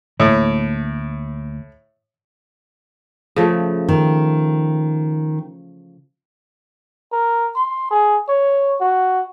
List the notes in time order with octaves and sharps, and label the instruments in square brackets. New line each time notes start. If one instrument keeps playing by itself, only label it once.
[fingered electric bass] D2 A#3 [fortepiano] A2
[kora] C#3 F3 A3
[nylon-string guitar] D#3
[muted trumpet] A#4
C6
G#4
C#5
F#4